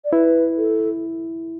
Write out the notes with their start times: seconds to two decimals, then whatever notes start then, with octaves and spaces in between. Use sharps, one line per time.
0.05 D5
0.12 E4 B4
0.58 A4